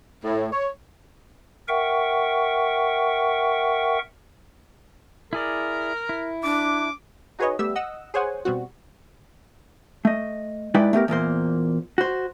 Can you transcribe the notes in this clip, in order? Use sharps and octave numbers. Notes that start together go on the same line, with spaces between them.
A2
C#5
A#4 E5 F#5 G5 C#6
E4 G#4 A#4 D5
E4
D4 D6
D#4 F#4 G#4 B4 C#5 D#5
G3 A3 B3 G4 E5 E6
D#5 F#5 E6
G#4 C5 C#5 F#5 G#5
B2 G3 C4 F#4
A3 D#5
G#3 D#4 E4 B4 D5 G5
A3 B3 G4 A#4
E2 A#2 A#3 C5
F#4 C5